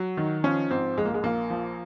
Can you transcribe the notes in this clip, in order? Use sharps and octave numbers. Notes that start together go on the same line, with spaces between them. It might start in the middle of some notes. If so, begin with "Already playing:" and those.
Already playing: F#3
D#3
F3 C#4
G#2 C4
A#1 G#3
A#3
G#3
A#1 A#3
F3